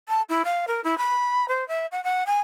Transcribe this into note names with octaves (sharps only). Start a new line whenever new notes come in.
A5
E4
F5
A#4
E4
B5
C5
E5
F#5
F#5
G#5